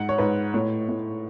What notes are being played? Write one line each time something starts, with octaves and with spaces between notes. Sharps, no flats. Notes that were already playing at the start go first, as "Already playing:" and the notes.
Already playing: G#2 F#5
C#5
G#2 B4
A2 C#5
A2